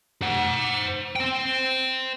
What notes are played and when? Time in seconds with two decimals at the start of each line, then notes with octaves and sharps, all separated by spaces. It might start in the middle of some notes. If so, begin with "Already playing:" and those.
0.22 C5 F#5
1.16 C5 G5